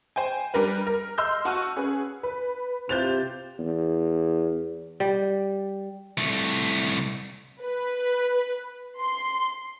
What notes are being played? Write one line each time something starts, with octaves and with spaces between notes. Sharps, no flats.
C5 G5 G#5
G3 D4 A#4 B4
A#4
D#5 C6 E6 F6 G6
F#4 F#5 A5 C#6 F6 D#7
C#4 G#4 B4
B4
C3 F4 G4 C5 G6 A6 F7
E2
G3
C2 A3
B4
C6